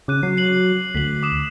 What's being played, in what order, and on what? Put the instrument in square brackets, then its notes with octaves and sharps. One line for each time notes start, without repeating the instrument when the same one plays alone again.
[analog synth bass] C#3 [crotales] D6 F#6 D#7
[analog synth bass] F#3 [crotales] C7
[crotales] C7 D#7 F#7
[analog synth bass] D2 [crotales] B6 F#7
[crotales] D6 D#6 E7